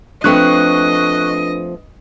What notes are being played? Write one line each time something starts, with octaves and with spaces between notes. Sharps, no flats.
F3 A3 C4 D4 B4 D#5 C#6 F#6